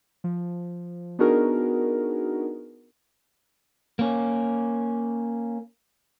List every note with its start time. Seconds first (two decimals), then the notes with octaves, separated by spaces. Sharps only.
0.24 F3
1.19 B3 D4 D#4 F#4 G#4 A#4
3.99 A#3 C#4